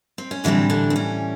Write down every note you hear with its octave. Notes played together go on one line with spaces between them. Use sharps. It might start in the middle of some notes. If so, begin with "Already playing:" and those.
C4
C#4
A2 D3 E3 G3 C4 D4
D3 D4
C4
C#4